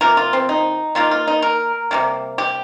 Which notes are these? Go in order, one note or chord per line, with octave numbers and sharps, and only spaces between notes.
C3 F3 A#3 A#4
F4
C4
D#4
D#3 A#3 F4
F4
D#4
A#4
C3 D#3 G3 A#3
G4